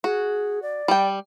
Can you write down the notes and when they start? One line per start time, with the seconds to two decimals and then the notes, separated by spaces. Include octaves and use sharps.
0.04 F#4 G#4
0.62 D5
0.88 G3 G5